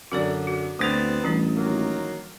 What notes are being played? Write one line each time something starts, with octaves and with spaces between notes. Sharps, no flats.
F#2 D3 F#4 A4 D5
F#4
D2 B3 C4 D#6 A6 F7
A1 E3 G3 D4
D#3 F#3 A#3